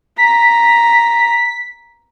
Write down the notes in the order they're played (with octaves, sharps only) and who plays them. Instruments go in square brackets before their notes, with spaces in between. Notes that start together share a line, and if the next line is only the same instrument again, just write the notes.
[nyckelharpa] A#5 [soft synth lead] B6